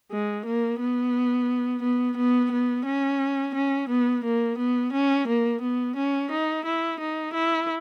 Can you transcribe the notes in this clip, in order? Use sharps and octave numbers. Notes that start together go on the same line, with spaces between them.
G#3
A#3
B3
B3
B3
B3
C#4
C#4
B3
A#3
B3
C#4
A#3
B3
C#4
D#4
E4
D#4
E4